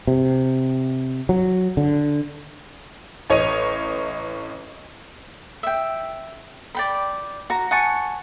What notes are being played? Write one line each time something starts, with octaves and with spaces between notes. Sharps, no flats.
C3
F#3
D3
A1 C#5 D#5 D#7
E5 G5
D5 G5 B5
F#4 A#5
F#5 G#5 A5 C#6